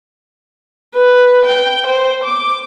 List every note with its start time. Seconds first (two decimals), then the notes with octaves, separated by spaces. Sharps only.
0.94 B4
1.45 G5
1.87 C5
2.24 D6